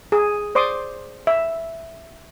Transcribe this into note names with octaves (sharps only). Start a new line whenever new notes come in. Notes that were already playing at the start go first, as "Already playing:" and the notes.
G#4
C5 D5 C6 D6 D#6
E5